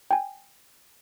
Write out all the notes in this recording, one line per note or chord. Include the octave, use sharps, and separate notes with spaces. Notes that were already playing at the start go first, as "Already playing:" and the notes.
G5 G#5